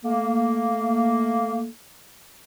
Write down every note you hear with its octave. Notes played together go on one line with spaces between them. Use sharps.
A3 A#3